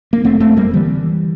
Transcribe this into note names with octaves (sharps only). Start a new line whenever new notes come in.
A#3
F1 A3 C4
A3 C4
F1
G3 A#3
D3 E3 G3